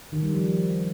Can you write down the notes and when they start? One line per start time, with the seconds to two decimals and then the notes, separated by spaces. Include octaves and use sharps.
0.12 D#3
0.23 G3
0.33 F3